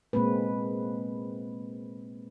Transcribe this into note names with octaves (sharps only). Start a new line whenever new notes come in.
A#2 G#3 A#3 C4 B4